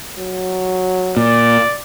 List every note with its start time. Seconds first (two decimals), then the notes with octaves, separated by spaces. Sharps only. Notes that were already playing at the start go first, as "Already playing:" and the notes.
0.18 F#3
1.17 A#2 D5